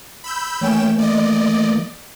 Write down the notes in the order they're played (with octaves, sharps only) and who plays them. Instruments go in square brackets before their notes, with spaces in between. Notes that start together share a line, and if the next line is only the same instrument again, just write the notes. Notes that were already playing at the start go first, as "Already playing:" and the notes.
[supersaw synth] B5 E6 G6
[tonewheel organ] E3 A3 A#3 [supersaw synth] C#4 G5 E7
[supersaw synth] D5 D#5